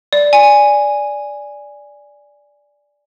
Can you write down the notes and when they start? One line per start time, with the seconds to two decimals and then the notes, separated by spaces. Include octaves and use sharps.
0.13 D5
0.33 G#5